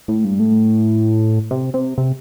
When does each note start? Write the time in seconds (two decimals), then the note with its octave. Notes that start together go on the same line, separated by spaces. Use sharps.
0.08 A2
0.24 G2
0.39 A2
1.51 C3
1.74 C3
1.98 C3